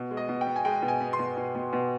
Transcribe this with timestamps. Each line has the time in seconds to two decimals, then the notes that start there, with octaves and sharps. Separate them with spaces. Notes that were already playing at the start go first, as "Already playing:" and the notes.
Already playing: B2
0.11 G#3
0.17 D#5
0.29 B2
0.41 G5
0.47 B3
0.56 G#5
0.65 G#3 G5
0.82 B2
0.88 G#5
1.01 B3
1.13 C6
1.19 B2
1.37 B2
1.55 B2
1.73 B2